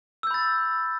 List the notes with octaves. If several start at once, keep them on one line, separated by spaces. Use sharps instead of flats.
B5 E6 G6 A6